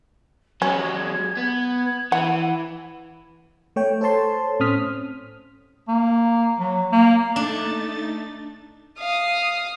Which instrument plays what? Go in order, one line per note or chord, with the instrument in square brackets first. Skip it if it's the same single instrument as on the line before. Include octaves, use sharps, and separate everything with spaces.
[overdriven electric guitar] F#3 G#3 [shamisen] C#4 [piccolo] G#6
[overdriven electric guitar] B3
[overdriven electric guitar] E3 [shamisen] F#5
[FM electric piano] A3 C#5 G5
A4 C5 C#5 A5 C6
A2 C4 C#4 D#6 F6 B6
[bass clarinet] A#3
F#3
A#3
[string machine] A3 D#4 A6 [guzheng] D4
[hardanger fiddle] F5 D#6